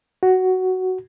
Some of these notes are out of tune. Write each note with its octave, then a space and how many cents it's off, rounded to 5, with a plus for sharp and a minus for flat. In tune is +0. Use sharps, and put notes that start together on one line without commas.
F#4 +10